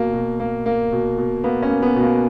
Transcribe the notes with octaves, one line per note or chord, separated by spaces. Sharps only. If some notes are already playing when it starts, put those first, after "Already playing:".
Already playing: B2 A#3
B2
A#3
A#3
B2
B2
A#3 B3
C#4
A#3
B3
B2
A#3